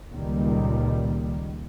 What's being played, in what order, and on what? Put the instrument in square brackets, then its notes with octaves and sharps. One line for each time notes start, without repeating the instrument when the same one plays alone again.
[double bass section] C#2 A#2 D#3 G3